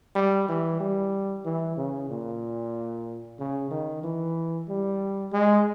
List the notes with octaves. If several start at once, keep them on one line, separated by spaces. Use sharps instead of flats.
G3
E3
G3
E3
C#3
A#2
C#3
D#3
E3
G3
G#3